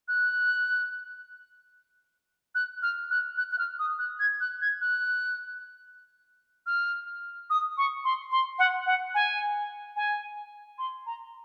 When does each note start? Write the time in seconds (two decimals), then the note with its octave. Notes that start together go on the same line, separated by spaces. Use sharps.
0.08 F#6
2.55 F#6
2.82 F6
3.11 F#6
3.37 F#6
3.51 F#6
3.59 F6
3.79 D#6
3.99 F#6
4.19 G#6
4.40 F#6
4.61 G#6
4.81 F#6
6.66 F6
7.50 D#6
7.77 C#6
8.05 C6
8.31 C6
8.59 F#5
8.86 F#5
9.14 G#5
9.96 G#5
10.78 C6
11.06 A#5